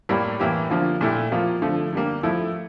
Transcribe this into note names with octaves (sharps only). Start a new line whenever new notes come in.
A2 G3 A#3 E4
A2 E3 A#3 E4 G4
D3 F3 A#3 F4
A#2 A3 E4 G4
F3 A#3 F4
D3 F3 A3
D3 G3 A#3
F3 A3 E4